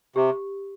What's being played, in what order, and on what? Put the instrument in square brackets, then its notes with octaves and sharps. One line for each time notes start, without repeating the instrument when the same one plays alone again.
[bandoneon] C3 [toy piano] G4